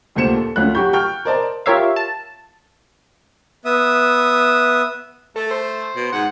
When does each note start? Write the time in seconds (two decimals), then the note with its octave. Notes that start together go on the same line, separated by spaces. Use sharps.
0.15 D#1 D2 A#2 C5 C#7 E7
0.36 A4
0.56 D2 C#4 F4 F#6
0.75 F#3 F#4 G4 C#6 G6
0.93 G5 C#6 F6 G6
1.25 A#4 C5 D5 D#5 A5
1.66 F4 G4 A#4 C#5 E5 F5
1.96 A5
3.65 B3 E5 D#6
5.36 A3 A4
5.51 C5
5.96 B2
6.12 G#2 F#5